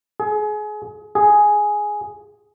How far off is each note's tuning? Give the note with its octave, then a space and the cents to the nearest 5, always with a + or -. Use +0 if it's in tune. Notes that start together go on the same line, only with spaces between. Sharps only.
G#4 +30
G#4 +5